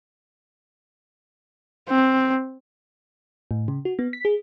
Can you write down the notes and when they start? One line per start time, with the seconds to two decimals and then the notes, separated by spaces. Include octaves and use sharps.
1.89 C4
3.51 A2
3.68 C#3
3.85 F#4
3.99 B3
4.13 B6
4.25 G#4